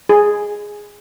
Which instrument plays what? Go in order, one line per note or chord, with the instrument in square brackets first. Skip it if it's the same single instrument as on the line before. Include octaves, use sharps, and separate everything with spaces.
[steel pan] G#4